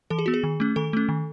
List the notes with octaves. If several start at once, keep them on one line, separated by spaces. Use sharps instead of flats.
E3 A4
G#4
B3 F#4
G#4
D#3
A3 C#4
D#3 A4
A3 C#4
D#3